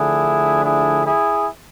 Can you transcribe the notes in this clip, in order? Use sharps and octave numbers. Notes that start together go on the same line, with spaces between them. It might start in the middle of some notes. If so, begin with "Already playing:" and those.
Already playing: D3 F3 A3 D4 E4 G#4
E4 G#4
E4 G#4